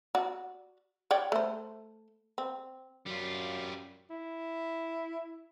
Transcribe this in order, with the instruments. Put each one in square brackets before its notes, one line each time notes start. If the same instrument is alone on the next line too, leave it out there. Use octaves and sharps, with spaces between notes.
[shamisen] F#4 D5
C#5 D5 G5
A3 C5
C4
[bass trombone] F#2 [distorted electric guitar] G3 F4
[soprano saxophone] E4